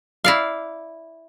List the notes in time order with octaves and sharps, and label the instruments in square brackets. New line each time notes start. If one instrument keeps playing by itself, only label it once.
[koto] E4 D5 F5